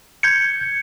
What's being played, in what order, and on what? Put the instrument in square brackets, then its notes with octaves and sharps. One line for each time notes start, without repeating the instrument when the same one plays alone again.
[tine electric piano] G6 G#6 C#7